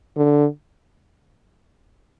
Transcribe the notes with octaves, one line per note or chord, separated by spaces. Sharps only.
D3